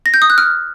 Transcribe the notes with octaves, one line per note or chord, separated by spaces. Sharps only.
A#6
G6
D#6
F#6
F6